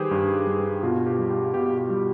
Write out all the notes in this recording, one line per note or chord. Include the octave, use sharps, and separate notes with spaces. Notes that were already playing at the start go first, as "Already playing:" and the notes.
Already playing: D#3 G3 G4 G#4 B4 C5
G2
G2
B2 F4
G4
G3
G4
B2 G4
G4
G3